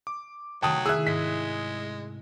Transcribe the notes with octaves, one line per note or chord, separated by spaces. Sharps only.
D6
C3 D#3 F#3 A3 G5 A5 D#6
E4 G#4 E5 D#6 E6 F#6
G#2 G#3 B6